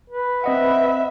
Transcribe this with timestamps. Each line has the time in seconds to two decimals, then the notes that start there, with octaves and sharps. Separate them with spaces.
0.10 B4
0.44 C4 D#5 E5 F#5